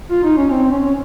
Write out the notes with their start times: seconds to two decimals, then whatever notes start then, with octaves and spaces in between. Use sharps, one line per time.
0.11 F4
0.24 D#4
0.37 C#4
0.50 C4
0.63 C4
0.71 C#4
0.85 C#4